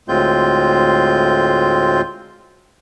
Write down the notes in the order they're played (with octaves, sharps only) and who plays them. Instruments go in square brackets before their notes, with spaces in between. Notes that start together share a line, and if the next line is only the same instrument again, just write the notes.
[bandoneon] D2 A2 G#3 C4 F4 G6